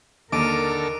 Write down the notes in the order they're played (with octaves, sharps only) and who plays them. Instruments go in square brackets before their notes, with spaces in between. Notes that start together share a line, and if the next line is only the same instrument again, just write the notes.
[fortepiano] D#2 [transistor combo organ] D3 A4 [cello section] A#4 [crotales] D6 D7 D#7